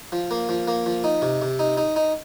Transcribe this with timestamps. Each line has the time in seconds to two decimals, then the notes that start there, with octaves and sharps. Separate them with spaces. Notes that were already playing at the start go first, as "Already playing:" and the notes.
0.12 F3
0.31 A#3
0.49 F3
0.68 A#3
0.86 F3
1.04 D#4
1.22 C3
1.42 C3
1.59 D#4
1.77 D#4
1.96 D#4